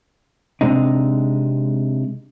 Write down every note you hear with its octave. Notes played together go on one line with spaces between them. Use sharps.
C3 G#3 D4 D#4